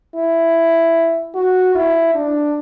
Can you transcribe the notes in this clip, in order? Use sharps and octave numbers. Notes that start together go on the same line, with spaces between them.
E4
F#4
E4
D4